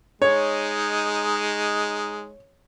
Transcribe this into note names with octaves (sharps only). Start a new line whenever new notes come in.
G#3 D#4 C#5